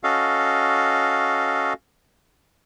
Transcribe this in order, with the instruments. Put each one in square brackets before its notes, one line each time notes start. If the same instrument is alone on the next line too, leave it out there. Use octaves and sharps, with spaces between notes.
[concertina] C#4 F#4 A4 D#5 F5